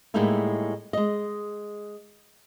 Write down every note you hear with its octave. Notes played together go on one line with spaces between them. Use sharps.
A2 G3 G#3 A#3 D#4 E4
G#3 D#5